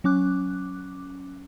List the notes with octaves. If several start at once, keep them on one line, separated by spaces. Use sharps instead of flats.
F#3 C#4 D6 F#6